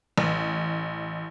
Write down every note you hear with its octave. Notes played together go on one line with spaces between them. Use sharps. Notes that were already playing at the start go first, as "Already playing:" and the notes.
A1